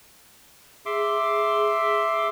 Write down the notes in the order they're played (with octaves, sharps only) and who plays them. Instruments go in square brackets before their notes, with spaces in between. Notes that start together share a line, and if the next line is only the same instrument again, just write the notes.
[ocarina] G#4 [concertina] E5 C6 D6